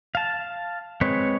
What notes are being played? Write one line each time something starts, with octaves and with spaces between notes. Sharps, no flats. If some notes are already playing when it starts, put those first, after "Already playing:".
F5 A5
G#3 C4 B4 C#5